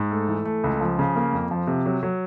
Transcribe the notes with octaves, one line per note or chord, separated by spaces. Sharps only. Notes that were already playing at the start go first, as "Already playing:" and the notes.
Already playing: G#2
A3
E3
A3
C#2
F3
C#3
A#3
F2
F3
C3
F#3
F#3